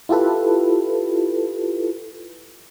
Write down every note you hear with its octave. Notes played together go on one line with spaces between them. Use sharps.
E4 F4 G4 A4 B4